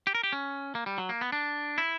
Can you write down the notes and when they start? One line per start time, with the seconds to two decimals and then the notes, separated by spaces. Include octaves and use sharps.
0.07 G4
0.15 A#4
0.23 G4
0.33 C#4
0.75 A#3
0.86 G3
0.98 F#3
1.09 A#3
1.21 B3
1.32 D4
1.78 E4